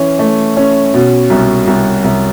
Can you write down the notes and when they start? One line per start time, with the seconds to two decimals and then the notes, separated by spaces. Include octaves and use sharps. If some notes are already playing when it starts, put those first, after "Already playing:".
Already playing: E3 C#4
0.19 A3
0.57 C#4
0.94 B2
1.30 C2
1.67 C2
2.04 C2